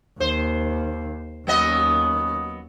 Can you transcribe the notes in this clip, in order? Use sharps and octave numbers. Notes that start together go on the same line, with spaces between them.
D#2 C5
D#2 F#3 B3 C#4 D#5